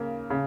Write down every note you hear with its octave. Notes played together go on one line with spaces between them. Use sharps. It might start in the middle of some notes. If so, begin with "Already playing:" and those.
Already playing: C#3 A#3
C#3